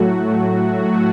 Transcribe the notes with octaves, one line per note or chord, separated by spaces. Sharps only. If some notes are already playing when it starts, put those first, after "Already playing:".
Already playing: A2 F#3 A3 F#4
A2 F#3 A3